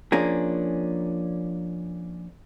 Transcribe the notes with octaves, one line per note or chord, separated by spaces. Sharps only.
F3 A#3 C#4 D4 G#4